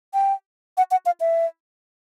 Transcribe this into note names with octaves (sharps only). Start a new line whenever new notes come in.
G5
F#5
F#5
F5
E5